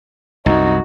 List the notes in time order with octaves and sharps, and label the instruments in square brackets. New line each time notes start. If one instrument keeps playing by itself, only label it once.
[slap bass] C2 F#2 [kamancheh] D#4 F#4